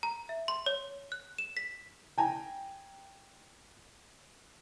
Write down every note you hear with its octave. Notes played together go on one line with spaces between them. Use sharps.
A#5
E5
C6
C#5
F#6
E7
B6
G5 G#5 A#5